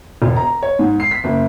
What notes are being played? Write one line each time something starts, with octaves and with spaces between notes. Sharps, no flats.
E1
A#5
C#5
G#2
C7
B6
F#1